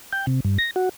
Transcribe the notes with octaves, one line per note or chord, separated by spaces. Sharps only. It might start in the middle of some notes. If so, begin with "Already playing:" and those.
G5
C3
G2
A#6
F#4